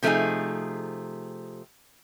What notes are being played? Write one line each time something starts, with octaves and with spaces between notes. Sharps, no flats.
C3 F3 A3 B3 D#4 G#4